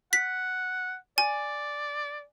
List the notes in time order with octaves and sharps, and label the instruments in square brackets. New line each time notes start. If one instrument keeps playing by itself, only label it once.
[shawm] F#5 [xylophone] B6
[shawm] D5 [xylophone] G#5